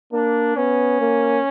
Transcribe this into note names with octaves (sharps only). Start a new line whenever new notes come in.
A#3 D4
B3 C#4
A#3